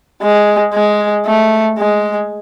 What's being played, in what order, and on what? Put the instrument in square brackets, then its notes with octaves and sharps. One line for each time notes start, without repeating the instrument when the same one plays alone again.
[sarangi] G#3
G#3
A3
G#3